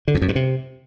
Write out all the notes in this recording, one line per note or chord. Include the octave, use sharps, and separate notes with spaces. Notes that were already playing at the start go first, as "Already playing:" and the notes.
D3
F2
F#2
G2
C3